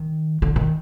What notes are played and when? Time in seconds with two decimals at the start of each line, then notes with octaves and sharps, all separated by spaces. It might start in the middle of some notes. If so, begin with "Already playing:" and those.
Already playing: D#3
0.42 D3
0.56 D#3